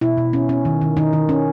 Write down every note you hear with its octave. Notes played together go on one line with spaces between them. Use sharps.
B2 E4
B2
C#4
C#4
D#3
D#3
D#3 D#4
D#3
C#4